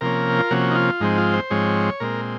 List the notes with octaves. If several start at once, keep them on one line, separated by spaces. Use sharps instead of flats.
C3 F3 A#3 C#4 A#4
F4
C3 F3 A#3 C#4 F#4
D#4
F4
G#2 F3 G#3 C4 D#4
F4
C5
G#2 F3 G#3 C4 C#5
A#2 G#3 C4 A#4